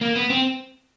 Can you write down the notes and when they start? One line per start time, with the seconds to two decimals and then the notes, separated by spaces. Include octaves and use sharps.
0.01 A#3
0.16 B3
0.30 C4